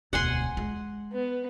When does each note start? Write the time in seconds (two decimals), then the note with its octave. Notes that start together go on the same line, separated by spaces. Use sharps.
0.13 E1 D2 F#5 G#5 C6
0.57 G#3
1.13 B3